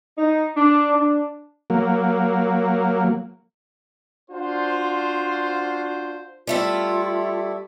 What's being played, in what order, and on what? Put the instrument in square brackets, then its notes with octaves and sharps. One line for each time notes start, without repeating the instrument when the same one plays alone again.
[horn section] D#4
D4
D4
[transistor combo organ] F#3 A#3
[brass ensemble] D4 F4 F#4 C5
[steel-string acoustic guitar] G3 A3 E4 [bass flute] F4